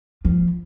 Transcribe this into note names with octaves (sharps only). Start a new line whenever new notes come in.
F3